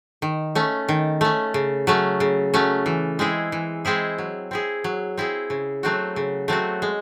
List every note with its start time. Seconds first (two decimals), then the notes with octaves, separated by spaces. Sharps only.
0.22 D#3
0.55 A3 C#4
0.89 D#3
1.21 A3 C#4
1.54 C#3
1.87 F#3 A3 C#4
2.20 C#3
2.54 F#3 A3 C#4
2.86 E3
3.19 G#3 C4 E4 G#4
3.52 E3
3.85 G#3 C4 E4 G#4
4.18 F#3
4.51 C4 E4 G#4
4.84 F#3
5.17 C4 E4 G#4
5.50 C#3
5.83 F#3 A3 C4 F#4
6.16 C#3
6.48 F#3 A3 C4 F#4
6.82 G#3